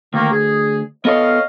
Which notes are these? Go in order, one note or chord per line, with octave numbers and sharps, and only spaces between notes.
D2 D#3 A#3
G#4
B3 A4 C#5 D#5 F5